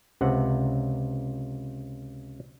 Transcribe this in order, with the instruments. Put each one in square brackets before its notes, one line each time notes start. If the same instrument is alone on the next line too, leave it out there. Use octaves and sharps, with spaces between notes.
[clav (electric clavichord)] C#2 C3 F#5